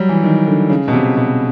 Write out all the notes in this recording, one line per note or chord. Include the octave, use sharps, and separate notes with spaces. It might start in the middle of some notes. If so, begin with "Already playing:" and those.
Already playing: F#3 G3
E3
D#3
D3
C#3
B2
C3
B2